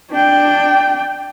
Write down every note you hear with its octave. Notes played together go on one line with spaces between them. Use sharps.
D4 G5